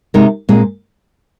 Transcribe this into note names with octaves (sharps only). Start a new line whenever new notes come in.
C3 G#3 D#4 A#4
A#2 G#3 C4 G#4